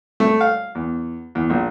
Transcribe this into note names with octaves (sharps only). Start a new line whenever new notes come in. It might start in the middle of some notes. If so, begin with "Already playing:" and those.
A3
F5
E2
E2
A#1